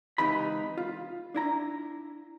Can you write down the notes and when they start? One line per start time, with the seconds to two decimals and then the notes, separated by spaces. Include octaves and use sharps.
0.18 C#2 C3 E3 D#4 B5
0.78 F4
1.34 D4 E4 A#5